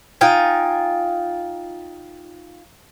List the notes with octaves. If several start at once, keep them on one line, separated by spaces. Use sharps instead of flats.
D#4 F4 G5 G#5